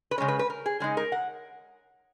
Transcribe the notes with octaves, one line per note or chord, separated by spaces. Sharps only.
B4
C#3 G#3 C#4 C#5
B4
B4
A#4
G#4
C#3 G#3 D#4 G#4
A#4
F#5